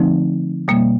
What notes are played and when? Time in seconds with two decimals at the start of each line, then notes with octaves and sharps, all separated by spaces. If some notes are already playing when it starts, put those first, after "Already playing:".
Already playing: D3 F3 A3 C4 D#4
0.68 B2 G3 A#3